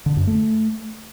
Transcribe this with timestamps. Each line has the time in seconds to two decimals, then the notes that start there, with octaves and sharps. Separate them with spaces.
0.06 D3
0.17 F#2
0.27 A3